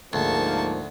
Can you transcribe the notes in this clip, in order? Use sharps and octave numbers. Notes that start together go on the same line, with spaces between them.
D2 G#2 F3 A#3 A5 C#6